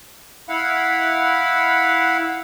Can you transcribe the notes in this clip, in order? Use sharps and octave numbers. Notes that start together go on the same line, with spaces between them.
E4 F5 F#5 B5